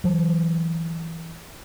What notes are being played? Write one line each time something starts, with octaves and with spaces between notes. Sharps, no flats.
E3 F#3